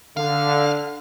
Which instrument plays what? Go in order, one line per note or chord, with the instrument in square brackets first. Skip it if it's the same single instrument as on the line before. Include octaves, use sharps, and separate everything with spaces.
[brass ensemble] D3 [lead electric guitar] F5